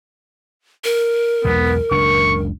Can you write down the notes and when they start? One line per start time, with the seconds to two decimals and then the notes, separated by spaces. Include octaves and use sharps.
0.84 A#4
1.44 B1 E2 G#3 B3
1.91 F#1 C#2 D4 C#6